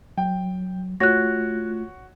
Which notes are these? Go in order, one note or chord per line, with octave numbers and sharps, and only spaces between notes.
F#3 G5
A3 F4 F#4 C#5 F#6 A#6